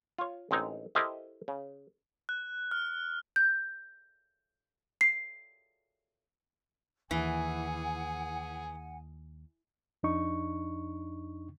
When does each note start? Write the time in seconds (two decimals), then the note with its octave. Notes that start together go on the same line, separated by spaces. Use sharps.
0.18 F4 C#5
0.51 A1 G#3 C4 D#4 A#5
0.95 E4 G4 A4 A#4 C5 D#5
1.48 C#3
2.29 F#6
2.71 F6
3.36 G6
5.01 C7
7.11 D#2 E3 G#4 F#5 G#5
10.03 F2 D4 D#4 C#6